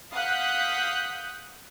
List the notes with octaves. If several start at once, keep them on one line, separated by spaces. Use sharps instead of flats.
F5 F#5 D#6 F#6 G6 B6